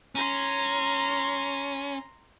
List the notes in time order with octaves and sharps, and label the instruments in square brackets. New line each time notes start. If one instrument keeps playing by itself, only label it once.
[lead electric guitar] C#4 [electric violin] A#5 C6